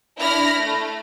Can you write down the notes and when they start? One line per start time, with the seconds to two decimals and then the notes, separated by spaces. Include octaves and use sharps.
0.20 D4 E4 B5 F6 A#6
0.60 A3